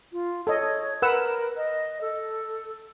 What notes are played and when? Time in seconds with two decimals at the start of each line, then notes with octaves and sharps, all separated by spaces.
0.13 F4
0.47 A4 C#5 D#5
1.02 A#4 B4 F#5 E6
1.57 D#5
2.01 A4